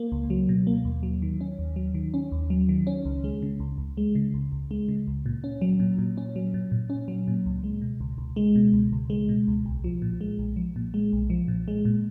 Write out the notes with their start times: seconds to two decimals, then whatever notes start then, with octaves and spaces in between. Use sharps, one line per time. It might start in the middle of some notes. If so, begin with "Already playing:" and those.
Already playing: A#3
0.12 C#2
0.30 F#3
0.49 B2
0.67 A#3
0.85 D#2
1.03 F#3
1.22 D#3
1.41 C#4
1.59 D#2
1.76 F#3
1.94 D#3
2.14 C#4
2.32 D#2
2.50 F#3
2.69 D#3
2.87 C#4
3.05 C#2
3.24 G#3
3.42 C#3
3.60 C#2
3.78 C#2
3.97 G#3
4.15 C#3
4.34 C#2
4.52 C#2
4.71 G#3
4.88 C#3
5.07 C#2
5.26 A#2
5.44 C#4
5.61 F#3
5.80 A#2
5.98 A#2
6.17 C#4
6.36 F#3
6.54 A#2
6.72 A#2
6.90 C#4
7.08 F#3
7.28 A#2
7.46 C#2
7.64 G#3
7.81 B2
8.00 C#2
8.18 C#2
8.36 G#3
8.56 B2
8.73 C#2
8.92 C#2
9.10 G#3
9.29 B2
9.48 C#2
9.65 B1
9.84 F3
10.02 A#2
10.21 G#3
10.39 B1
10.56 F3
10.76 A#2
10.94 G#3
11.13 B1
11.30 F3
11.48 A#2
11.68 G#3
11.85 A#2